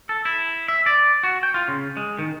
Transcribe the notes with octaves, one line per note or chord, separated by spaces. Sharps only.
A4
E4
E5
D5
F#4
G5
F4
C#3
G#3
D#3